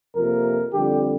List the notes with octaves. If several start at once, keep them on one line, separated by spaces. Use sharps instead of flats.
F2 C3 A#3 A#4
F2 D3 G3 G4